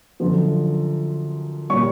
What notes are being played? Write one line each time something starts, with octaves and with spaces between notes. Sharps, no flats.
F#2 D3 F3
A#2 G3 C#5 C#6